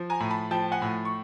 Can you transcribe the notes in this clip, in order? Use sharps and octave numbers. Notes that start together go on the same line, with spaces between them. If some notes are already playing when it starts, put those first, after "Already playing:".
Already playing: F3
G#5 A#5
A2
A5 B5
F3 G5 A5
F#5 G#5
A2
C#6